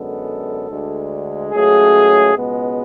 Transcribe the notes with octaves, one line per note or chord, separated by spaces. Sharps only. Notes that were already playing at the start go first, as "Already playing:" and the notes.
Already playing: F#2 D3 G#3 B3 A4
D2 D3 G#3
C#2 C#3 F#3 A3 G#4
C#2 B2 G#3 B3